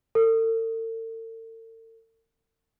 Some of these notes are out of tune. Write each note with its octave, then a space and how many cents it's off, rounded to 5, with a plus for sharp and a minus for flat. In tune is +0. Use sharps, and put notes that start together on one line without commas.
A4 +45